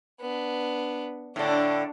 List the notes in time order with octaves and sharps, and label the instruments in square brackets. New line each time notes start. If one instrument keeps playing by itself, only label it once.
[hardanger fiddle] B3 D4
[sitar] A2 D3 [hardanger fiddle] D4